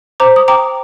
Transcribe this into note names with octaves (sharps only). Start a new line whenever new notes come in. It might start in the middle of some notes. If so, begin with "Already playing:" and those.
C5 A#5 D6
D#6
G5 A#5 D6